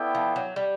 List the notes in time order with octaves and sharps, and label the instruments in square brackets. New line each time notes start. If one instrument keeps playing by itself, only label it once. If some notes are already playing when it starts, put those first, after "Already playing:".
Already playing: [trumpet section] B3 E4 A4 D5 G5
[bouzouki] F3
F#3
G3